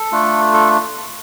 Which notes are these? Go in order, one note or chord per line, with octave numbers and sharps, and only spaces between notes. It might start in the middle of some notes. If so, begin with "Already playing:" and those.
Already playing: A4
A3 D4 F4
A4